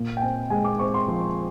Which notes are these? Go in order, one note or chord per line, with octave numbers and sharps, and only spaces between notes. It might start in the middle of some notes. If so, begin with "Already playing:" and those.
Already playing: A#2
G5
C4 G#5
G#3 G#5
D6
C4 C#6
C6
F3